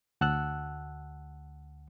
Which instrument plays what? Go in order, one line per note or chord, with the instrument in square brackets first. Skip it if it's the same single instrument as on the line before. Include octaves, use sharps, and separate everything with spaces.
[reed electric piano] D2 F#5 A5 E6 F#6